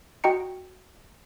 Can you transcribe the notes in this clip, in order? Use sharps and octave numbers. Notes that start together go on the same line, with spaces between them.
F#4 D#5 G5 A#5 C#7